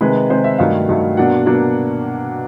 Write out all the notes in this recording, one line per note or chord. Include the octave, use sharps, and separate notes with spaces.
C3 D#3 G#3 B4
C3 D#3 G#3 C5
E5
G2 D#3 F#3 A3 F5
G2 D#3 F#3 A3
B2 F#3 A#3 D4 F#5
B2 F#3 A#3 D4